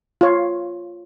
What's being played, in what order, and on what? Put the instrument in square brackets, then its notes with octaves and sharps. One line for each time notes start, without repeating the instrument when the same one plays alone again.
[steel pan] F4 C#5